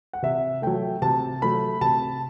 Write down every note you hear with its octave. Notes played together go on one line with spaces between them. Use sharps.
F#5
C3 E5
F#3 A3 G5
C3 A5
F#3 A3 B5
C3 A5